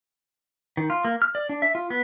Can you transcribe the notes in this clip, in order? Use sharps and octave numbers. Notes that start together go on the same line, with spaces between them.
D#3
F4
A#3
F6
D5
D4
E5
F4
B3